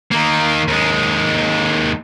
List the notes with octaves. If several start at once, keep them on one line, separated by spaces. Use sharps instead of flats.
D#3 A#3
D#2 G#3